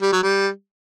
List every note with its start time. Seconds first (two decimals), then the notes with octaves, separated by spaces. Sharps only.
0.02 G3
0.12 F#3
0.23 G3